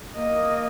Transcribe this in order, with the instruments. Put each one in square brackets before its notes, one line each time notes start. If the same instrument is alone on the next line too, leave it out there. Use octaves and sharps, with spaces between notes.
[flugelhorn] A#3 [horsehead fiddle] D#5